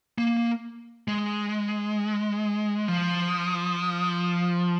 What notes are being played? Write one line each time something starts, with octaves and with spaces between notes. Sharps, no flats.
A#3
G#3
F3